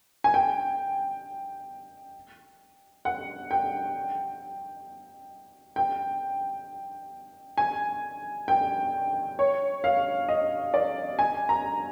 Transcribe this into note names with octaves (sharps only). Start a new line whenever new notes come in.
G#5
G5
F#5
G5
G5
G#5
G5
C#5
F5
D#5
D5
G#5
A#5